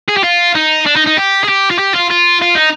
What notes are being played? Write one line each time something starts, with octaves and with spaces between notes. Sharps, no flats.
G#4
G4
F4
D#4
D4
D#4
D#4
G4
G#4
G4
F4
G4
F4
F4
F4
D#4